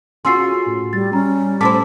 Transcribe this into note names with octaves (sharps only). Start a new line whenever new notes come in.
C#4 F4 F#4 G#4 C6 E6 C7
A2
G3 A6
G3 C#4 A#5
A2 E4 C5 A5 D6 B6